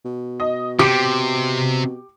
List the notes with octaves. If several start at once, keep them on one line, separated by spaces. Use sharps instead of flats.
B2
D#5
C3 G4 D6 C#7 D7